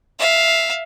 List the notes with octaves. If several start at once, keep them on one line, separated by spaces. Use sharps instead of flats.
E5 F5